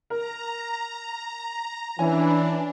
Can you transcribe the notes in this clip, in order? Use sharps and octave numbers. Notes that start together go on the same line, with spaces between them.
A#4 A#5
E3 C#4 D4 G#5